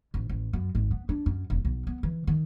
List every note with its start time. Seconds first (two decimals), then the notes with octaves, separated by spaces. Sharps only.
0.14 A1
0.29 A1
0.53 F#2
0.75 G#1
0.91 B3
1.09 D4
1.26 F#2
1.50 E1
1.65 B1
1.87 B3
2.03 E3
2.27 D#3